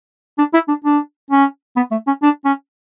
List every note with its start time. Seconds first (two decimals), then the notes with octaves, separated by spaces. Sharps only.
0.38 D4
0.54 E4
0.68 D4
0.84 D4
1.31 C#4
1.76 B3
1.91 A3
2.07 C#4
2.22 D4
2.45 C#4